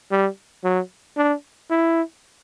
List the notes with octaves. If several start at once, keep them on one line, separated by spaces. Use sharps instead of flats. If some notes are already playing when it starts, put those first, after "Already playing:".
G3
F#3
D4
E4